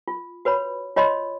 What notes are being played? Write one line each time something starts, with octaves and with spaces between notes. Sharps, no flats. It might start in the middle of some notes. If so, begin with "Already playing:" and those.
F4
F#4 B4 C#5 B5
F4 C#5 D#5 B5 C6